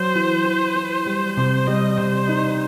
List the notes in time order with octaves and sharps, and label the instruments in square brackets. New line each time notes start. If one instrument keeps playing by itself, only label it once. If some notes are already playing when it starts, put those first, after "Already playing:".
Already playing: [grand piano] F#3 [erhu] C5
[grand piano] E3
E3
E3
G3
[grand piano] C3 [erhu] C5
[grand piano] G3 [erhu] D#5
[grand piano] C3 [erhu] C5
[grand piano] D#4